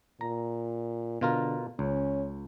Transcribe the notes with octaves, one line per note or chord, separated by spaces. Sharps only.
A#2 A#5
B2 D3 F4 A#4
C#2 C#4